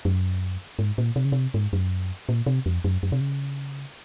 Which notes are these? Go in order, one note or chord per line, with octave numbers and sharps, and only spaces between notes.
F#2
G#2
A#2
C3
C#3
C3
G#2
F#2
A#2
C3
F2
F#2
F#2
C3
C#3